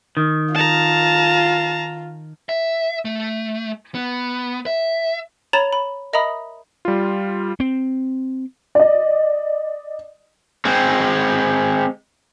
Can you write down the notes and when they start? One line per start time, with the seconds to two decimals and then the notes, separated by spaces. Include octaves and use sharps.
0.17 D#3
0.55 F4 A5 A#5
2.49 E5
3.05 A3
3.95 B3
4.66 E5
5.53 C#5 A#5 B5 A6 E7 F7
5.73 B5
6.13 A#4 D#5 E5 A#5 B5 D#6
6.85 G3 F4
7.60 C4
8.75 D5 D#5
10.65 G#3 C4